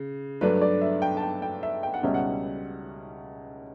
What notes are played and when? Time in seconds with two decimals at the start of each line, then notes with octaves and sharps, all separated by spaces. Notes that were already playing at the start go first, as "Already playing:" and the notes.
Already playing: C#3
0.41 G2 F#3 A3 D4 B4
0.61 D5
0.81 E5
1.02 G5
1.17 A5
1.22 G5
1.42 G5
1.63 E5
1.83 G5
1.94 F#5
2.03 C#2 B2 G3 C#4 E5
2.14 F#5